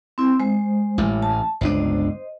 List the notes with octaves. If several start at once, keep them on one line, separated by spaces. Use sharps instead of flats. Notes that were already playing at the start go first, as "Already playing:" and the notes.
C4 E4
G#3 C5
A1 A2
A5
G1 C#2 D4 C5 D#5